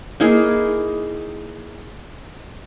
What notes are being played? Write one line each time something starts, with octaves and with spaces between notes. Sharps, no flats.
A#3 D#4 E4 G#4